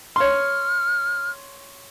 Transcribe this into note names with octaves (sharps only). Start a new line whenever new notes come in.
C#5 C6 F6